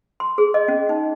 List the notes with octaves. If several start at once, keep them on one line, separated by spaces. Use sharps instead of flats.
C6
G#4
D#5
C#4
D#4